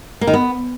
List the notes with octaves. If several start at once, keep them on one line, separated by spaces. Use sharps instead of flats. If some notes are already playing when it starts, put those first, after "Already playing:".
A#3
D#3
B3